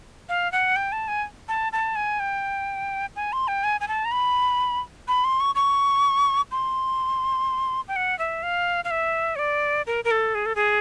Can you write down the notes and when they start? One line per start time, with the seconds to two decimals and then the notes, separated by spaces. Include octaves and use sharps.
0.29 F5
0.52 F#5
0.76 G5
0.92 A5
1.08 G#5
1.48 A5
1.73 A5
1.96 G#5
2.20 G5
3.16 G#5
3.33 C6
3.48 G5
3.64 G#5
3.81 G#5
3.88 A5
4.05 A#5
4.12 B5
5.08 B5
5.24 C6
5.40 C#6
5.55 C#6
6.51 C6
7.88 G5
7.96 F#5
8.19 E5
8.43 F5
8.85 F5
8.91 E5
9.36 C#5
9.39 D5
9.87 A#4
10.05 A#4
10.11 A4
10.35 G#4
10.46 A4
10.56 G#4